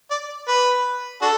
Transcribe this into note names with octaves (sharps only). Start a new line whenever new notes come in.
D5
B4
D4 F#4 A4